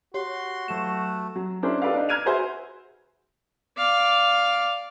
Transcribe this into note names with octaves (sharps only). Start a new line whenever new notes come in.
F#4 G4 C#5 C6
F#3 A3 E7
F#3
C#4 D4 E4 G#4 A#4 C5
G4 A4 B4 D5 F5
D4 D#4
A#5 F6 G#6 D#7 F7
F#4 G#4 B4 C5 E5 B5
D5 F5